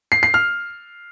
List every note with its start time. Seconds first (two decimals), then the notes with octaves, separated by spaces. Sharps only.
0.12 C7
0.23 C7
0.34 F6